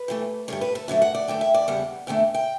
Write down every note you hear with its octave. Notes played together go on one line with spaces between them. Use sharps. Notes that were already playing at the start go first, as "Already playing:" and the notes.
Already playing: B4
G2 E3 A3
G2 D3 G3 C#5
B4
A4
F#2 D3 F#3 A3 E5
F#5
D5
F#2 D3 A3 G5
E5
D5
E2 C#3 G3 F#5
E2 D3 A3 G5
G5